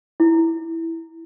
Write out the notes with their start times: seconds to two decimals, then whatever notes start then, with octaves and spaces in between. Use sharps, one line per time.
0.20 E4